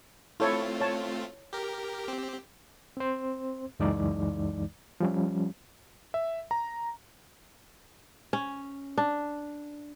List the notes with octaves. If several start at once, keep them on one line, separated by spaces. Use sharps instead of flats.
A3 C4 E4 F4 A4 C#5
C#5 A5
G4 A#4
C4 G4
C4 C5
C#2 F#2 E3 G#3 D#4 D5
F3 G3 C#4
E5
A#5
C#4
D4